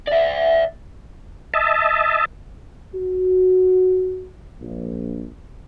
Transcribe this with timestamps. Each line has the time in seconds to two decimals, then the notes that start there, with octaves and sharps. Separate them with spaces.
0.07 D5 E5
1.54 D#5 E5 A5
2.95 F#4
4.60 A#1